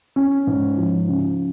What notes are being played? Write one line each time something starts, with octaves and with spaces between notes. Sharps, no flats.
C#4
G#2
F3
C#3